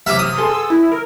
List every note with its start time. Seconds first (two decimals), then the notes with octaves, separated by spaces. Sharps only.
0.06 F#2 C3 E5 D6 F6
0.19 D#6
0.37 B3 G#4 A4 C6
0.49 E6
0.70 E4 E6
0.92 A#4